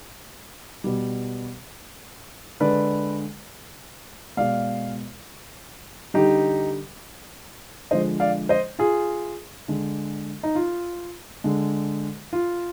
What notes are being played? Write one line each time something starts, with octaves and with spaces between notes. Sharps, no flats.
B2 G3
D3 G#3 B4 D5
B2 G#3 D5 F5
D3 G3 D#4 G4
D3 F3 G#3 C5 D#5
D5 F5
C5 D#5
F4 G#4
D3 G#3
D#4
F4
D3 G#3
F4